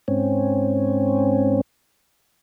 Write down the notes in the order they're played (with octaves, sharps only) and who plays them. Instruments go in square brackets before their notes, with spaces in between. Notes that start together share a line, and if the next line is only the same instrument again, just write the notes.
[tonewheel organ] G#2 C4 C#4